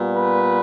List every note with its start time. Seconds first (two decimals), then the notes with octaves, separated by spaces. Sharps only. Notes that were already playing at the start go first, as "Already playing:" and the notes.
Already playing: A#2 G3 B3
0.16 B4